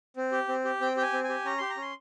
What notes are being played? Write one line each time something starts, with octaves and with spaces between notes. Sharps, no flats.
C4
G4
C4
G4
C4 G5
G4 G5
G#5
C4
G#5
G4
C#4 A#5
G4 C6
A#5
C#4 C6